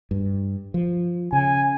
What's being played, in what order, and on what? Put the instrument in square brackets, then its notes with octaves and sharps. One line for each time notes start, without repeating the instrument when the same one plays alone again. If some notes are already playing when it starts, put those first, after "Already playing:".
[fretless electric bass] G2
F3
[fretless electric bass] C#3 [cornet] G#5